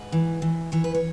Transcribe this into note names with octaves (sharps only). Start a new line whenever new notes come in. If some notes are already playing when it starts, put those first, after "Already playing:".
Already playing: G#2 B4
E3
E3
E3 C#5
B4
C#5